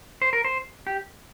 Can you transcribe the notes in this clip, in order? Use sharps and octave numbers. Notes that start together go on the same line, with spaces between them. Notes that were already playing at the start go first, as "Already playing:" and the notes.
C5
A#4
C5
G4